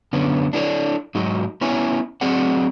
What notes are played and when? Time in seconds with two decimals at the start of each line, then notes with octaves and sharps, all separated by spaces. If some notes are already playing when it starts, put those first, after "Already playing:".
0.13 F#2 D3 B3 C#4
0.53 D4 E4 A4 B4 C#5 D5
1.15 G#2 F#3 G#3 D#4 F#4 D#5
1.61 B3 C#4 E4 C#5 E5 G#5
2.21 F#3 C4 G#4 D5 D#5 F#5